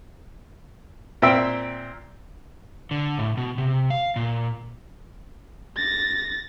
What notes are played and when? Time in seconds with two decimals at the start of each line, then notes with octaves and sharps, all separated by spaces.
1.22 A#2 C4 E5 G5 E6
2.91 D3
3.18 A2
3.37 B2
3.58 C3
3.90 F5
4.16 A#2
5.76 A6 A#6